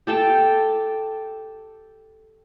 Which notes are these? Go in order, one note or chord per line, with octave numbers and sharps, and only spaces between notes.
G4 A4 G5 A5